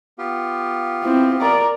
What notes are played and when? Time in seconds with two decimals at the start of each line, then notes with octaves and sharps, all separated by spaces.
0.18 B3 F4 G4
1.03 C4 E4
1.41 A#4 D5